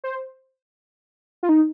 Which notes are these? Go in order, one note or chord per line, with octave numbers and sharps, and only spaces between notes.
C5
F4
D#4